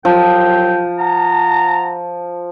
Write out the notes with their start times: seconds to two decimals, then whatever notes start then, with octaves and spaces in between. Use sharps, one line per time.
0.05 C2 F3 F#3 G5
0.99 F#5 A5 A#5